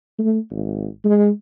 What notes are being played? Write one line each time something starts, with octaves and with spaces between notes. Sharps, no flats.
A3
G#1
G#3